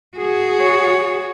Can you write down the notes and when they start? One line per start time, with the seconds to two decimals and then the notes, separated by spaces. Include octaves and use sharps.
0.18 F#4 G#4
0.60 C#5